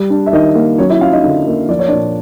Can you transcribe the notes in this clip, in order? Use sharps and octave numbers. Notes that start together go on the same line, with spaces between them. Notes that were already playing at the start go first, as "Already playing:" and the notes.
Already playing: G3
D4
E5
D#3 D#4 D#5
A#3
F#3 C#4 C#5
E4 E5
C#4 F4 F5
D#4 D#5
D3
A#3
F3 D5
C#5
D4 D5
A#2